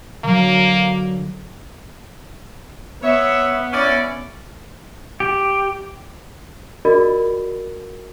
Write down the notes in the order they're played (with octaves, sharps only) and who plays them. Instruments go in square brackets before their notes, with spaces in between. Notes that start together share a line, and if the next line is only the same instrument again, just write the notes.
[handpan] D3 F#3 [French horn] A#3
[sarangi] B3 [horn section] C#5 E5
[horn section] C#4 E4 D5
[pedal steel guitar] G4
[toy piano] F4 F#4 G#4 A#4 D5 D#5